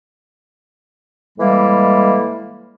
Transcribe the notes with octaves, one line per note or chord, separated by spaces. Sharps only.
A2 E3 G3 G#3 A#3